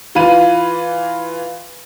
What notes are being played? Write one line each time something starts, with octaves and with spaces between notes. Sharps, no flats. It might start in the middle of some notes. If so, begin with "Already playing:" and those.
E3 F4 B5 D#7